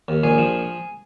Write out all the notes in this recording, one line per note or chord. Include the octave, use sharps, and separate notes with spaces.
D#2
A#1 G#4
F3